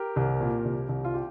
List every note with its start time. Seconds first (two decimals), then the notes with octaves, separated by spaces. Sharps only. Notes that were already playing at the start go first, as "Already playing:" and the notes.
Already playing: G4 A#4
0.16 C2
0.41 A#2
0.65 C2
0.89 C2
1.05 F4
1.14 G4